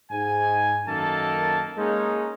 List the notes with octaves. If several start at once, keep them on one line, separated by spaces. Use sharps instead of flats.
G#2 G#5
F#2 D#3 A#3 A4 A5
G#3 A#3 C#4 D#4